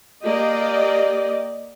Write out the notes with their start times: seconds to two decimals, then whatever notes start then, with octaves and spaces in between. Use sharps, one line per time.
0.24 A#3 G4 D5 D#5